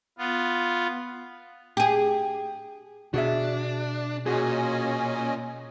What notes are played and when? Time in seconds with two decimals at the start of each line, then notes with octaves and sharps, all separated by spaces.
0.18 B3 F4
1.77 G4 G#4
3.14 B2 D4 F#4 G#4 E5
4.26 A#2 C#4 F#4 G#4 D#5 G#5